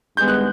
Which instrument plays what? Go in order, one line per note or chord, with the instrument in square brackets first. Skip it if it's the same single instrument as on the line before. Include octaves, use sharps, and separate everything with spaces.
[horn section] G2 D#3 G#3 B3 [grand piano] G6
[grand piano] F#6